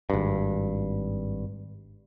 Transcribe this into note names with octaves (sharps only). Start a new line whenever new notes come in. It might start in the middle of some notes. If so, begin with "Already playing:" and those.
G#1 G2